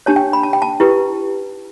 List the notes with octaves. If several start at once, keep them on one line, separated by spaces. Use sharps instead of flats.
D4 G4 C#5 A5
G5
B5
A5
G5
A5
E4 G4 B4